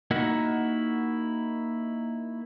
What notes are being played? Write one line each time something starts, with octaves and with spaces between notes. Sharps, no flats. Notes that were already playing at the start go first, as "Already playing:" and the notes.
A#3 D#4 E4 F#4 A#4 F#5